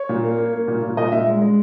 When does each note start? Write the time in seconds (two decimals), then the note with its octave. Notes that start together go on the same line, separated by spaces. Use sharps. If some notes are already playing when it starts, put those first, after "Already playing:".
Already playing: C#5
0.09 A#2
0.24 A#3
0.38 A#3
0.53 A#3
0.68 A#2
0.83 A#2
0.97 A#2 D#5
1.12 A#2 E5
1.26 G#3
1.42 G#3